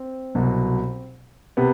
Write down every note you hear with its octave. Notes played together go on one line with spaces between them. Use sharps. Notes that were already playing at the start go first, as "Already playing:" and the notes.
Already playing: C4
C2 B2 F#3
C3 B3